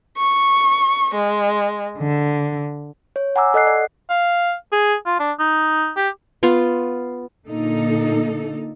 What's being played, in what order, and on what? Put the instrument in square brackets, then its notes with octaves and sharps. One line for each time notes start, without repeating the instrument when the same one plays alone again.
[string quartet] C#6
G#3
D3
[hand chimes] C#5
F#5 G#5 A#5 D6 E6
A4 D#5 F#5 F#6 C7
D5
[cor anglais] F5
G#4
F4
D4
D#4
G4
[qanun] B3 F4 F5 C6
[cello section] A#2 D3 A#3 D#4 A4